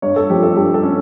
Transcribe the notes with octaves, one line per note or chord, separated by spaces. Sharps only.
G2 C#5
A4
F3 G4
A4
G2 G4
A4
C#4